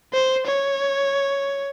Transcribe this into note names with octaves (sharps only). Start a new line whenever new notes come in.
C5
C#5